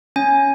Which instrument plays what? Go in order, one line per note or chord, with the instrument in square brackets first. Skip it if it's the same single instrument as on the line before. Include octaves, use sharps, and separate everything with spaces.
[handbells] C#4 G#5